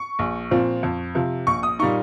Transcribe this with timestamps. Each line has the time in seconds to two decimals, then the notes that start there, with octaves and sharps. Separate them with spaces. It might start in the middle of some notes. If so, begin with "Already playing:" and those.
Already playing: C#6
0.19 A#1
0.51 A#2 F3 C4
0.83 F2
1.15 C3 F3
1.47 A#1 C#6
1.63 D#6
1.79 A#2 G3 A#3 D#4 C#6